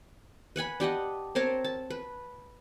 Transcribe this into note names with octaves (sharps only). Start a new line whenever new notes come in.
B4 F#5 G#5 B5
D4 G4 D#5 F#5
C4 A#4 C#5 A5
A5
B4